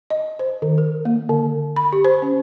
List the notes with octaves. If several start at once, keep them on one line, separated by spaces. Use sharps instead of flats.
D#5
C5
D#3
A#4
A#3
D3
B5
G4
C5
C#4